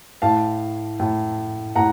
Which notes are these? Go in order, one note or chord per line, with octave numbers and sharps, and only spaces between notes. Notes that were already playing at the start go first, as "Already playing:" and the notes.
A2 F5 A5
A2
A2 F#5 A#5